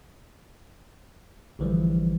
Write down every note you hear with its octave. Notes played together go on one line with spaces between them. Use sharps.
A1 D3 E3 F3 G3